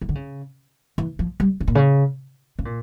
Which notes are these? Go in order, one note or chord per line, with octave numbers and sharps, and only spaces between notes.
E3
D3
C#3
E3
F3
G3
C#3
A#2
C#3
C#3
A#2